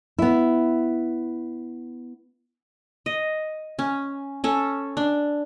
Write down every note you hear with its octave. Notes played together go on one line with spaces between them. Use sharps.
B3 E4
D#5
C#4
C#4 A4
D4